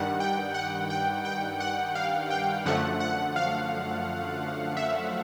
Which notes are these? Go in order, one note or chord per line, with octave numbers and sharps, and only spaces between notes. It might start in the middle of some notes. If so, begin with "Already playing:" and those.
Already playing: G2 D#3 G3 F#5
G5
F#5
G5
G5
F#5
F5
G5
F#2 D3 F3 A3 F#5
F#5
F5
E5